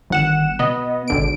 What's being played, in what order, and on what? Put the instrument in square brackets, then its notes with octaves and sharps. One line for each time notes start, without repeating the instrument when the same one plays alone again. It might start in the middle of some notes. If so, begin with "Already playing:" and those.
[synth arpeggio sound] G1 F#5 E7 [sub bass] D#3
[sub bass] B2 [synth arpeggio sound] B3 D#5
[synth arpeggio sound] G#1 D3 D7